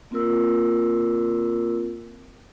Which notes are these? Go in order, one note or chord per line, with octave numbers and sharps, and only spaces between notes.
A#3 C4 F4 A#4 E6